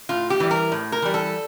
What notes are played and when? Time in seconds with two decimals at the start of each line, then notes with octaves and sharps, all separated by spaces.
0.09 A2 F4
0.30 G4
0.40 E3 G3
0.51 A#4
0.72 A2
0.92 A#4
1.02 E3 G3
1.14 A4